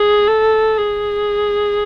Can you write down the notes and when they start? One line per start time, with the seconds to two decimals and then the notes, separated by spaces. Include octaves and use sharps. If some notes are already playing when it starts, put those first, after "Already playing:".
Already playing: G#4
0.27 A4
0.78 G#4